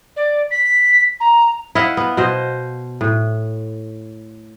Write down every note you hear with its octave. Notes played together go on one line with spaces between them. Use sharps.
D5
B6
A#5
E4 D#5 F5 F#5
B3
B2 C5 D#5
A2